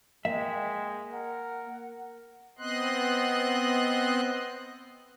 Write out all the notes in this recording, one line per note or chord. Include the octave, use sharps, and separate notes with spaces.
G#3 A#3 E5 G5
A#4 F#5
B3 C4 D#5 C6 F#6